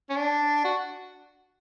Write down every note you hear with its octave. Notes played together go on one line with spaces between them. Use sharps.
C#4
D4
F#4